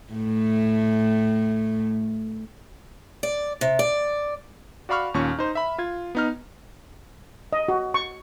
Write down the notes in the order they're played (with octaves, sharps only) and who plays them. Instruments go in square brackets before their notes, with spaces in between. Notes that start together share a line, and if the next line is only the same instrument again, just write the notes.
[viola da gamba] A2 A3
[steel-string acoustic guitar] D5
C3
D5
[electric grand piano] F#4 D5 F5 B5 C#6 F6
D#2 A#2 C#4 C#6
D#4 C5
E5 B5
F4 G#6
B3 D#4 F6
[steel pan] D#5
F#4
C#6